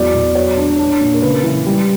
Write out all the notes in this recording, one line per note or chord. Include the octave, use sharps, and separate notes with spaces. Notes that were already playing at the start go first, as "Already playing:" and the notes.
Already playing: E2 F#3 D5
B2
F#3 C#5
D4
D4
A#2
A#4
C#3 B4
E3
G3